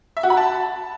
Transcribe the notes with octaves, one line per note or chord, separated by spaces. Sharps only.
E5
F#4
B5
A5